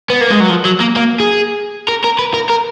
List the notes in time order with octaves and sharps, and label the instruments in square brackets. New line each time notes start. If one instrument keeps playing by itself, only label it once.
[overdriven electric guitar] B3
A#3
G#3
F#3
F3
F#3
A#3
A#3
G#4
A#4
A#4
B4
A#4
A#4